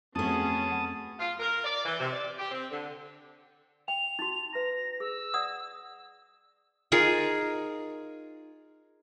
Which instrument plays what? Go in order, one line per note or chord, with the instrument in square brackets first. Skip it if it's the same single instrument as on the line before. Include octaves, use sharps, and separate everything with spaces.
[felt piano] F2 A3 [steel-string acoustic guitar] F#3 B3 [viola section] C#4 G#4 [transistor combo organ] A5 D#6
[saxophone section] F4
A#4
D5
E3
C3
D5
G4
C4
D3
[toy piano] G5 [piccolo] F7
[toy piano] D#4 F#4
[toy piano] B4 A#5 [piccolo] A#6
[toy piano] G#4 [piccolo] E6
[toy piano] D5 F#5 D#6
[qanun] D#4 F4 G#4 A#4